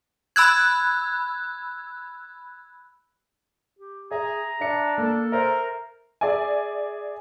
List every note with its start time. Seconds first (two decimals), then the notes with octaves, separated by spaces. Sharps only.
0.36 B5 E6 F#6 G#6
3.79 G4
4.11 G#4 E5 A#5
4.61 D4 E5 C#7
4.98 A#3 A4
5.32 A#4 C5 E5
6.21 G#4 D5 E5 G#5